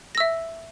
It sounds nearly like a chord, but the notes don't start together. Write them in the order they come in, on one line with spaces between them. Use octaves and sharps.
A#6 E6 E5